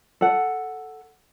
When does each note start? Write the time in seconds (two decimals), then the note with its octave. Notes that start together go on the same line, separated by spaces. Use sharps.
0.21 A4 F#5